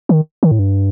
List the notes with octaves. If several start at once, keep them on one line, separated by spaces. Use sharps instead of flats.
D#3
D#3
A2
G2